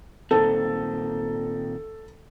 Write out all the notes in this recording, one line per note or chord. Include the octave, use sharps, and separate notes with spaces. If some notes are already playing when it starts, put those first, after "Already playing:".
A#2 D#3 C4 A4